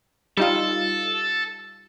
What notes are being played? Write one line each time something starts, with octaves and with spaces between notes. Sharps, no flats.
G3 D#4 F4 A4